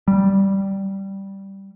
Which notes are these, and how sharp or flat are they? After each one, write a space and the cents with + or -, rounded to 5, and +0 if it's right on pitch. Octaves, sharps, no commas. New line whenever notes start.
G3 -10